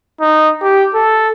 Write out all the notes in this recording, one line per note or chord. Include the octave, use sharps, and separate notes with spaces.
D#4
G4
A4